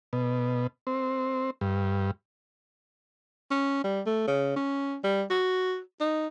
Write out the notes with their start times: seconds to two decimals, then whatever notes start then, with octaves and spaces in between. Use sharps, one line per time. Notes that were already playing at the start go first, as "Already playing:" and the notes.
0.13 B2
0.87 C4
1.61 G2
3.51 C#4
3.84 G3
4.06 A3
4.28 C#3
4.56 C#4
5.04 G3
5.30 F#4
6.00 D#4